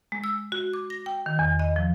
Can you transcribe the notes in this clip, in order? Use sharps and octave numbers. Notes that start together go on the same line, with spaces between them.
G#3
E6
F#4
D6
A#6
G5
D#3
E2
D#5
F3